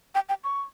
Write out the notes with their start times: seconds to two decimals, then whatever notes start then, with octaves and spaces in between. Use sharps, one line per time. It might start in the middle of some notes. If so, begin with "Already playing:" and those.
0.15 G5
0.29 G5
0.44 C#6